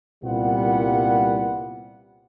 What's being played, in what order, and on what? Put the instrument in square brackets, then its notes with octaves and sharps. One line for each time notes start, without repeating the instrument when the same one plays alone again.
[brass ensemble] C2 A#2 G3 B3 F4 F#5